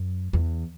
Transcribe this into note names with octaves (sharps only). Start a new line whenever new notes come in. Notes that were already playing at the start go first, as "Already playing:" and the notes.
Already playing: F#2
E2